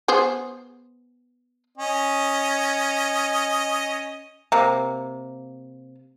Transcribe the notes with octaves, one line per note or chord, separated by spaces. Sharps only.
B3 G#4 C5
C#4 D#5
C3 A#3